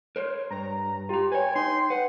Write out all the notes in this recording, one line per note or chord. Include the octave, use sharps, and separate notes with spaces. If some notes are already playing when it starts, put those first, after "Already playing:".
A#4 C5 C#5
G2 A#5
F4 G4 A#5
B4 C#5 G5 G#5
D#4 C6
B4 F#5